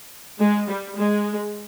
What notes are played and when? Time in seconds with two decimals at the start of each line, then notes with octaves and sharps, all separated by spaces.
0.40 G#3
0.68 G3
0.96 G#3